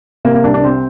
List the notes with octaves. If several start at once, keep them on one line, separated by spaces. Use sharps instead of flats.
C3 A#3
A#3
C2 D4
D4
C3 C4